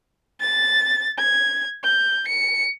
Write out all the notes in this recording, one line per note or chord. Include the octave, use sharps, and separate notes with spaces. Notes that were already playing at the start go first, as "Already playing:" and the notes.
A6
G#6
G6
C#7